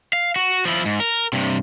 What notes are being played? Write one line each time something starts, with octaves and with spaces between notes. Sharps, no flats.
F5
F#4
F3 E4
G#2
A#4
G2 C3